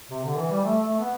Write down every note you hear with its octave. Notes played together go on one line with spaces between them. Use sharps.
C3
D3
E3
G3
A3
A3
B3